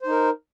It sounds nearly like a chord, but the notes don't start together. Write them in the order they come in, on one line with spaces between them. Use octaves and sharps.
C5 D#4 A#4